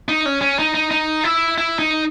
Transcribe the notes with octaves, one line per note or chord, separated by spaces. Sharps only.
D#4
C#4
C#4
D#4
D#4
D#4
E4
E4
D#4